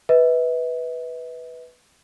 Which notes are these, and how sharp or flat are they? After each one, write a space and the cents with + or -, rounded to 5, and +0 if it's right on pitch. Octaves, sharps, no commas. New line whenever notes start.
B4 +0 E5 -45